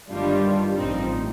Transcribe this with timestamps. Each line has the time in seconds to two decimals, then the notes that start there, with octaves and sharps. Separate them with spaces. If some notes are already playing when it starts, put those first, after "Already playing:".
0.10 G1 G2 D#3 G3 D4 F4
0.76 A1 A2 F3 C4 D#4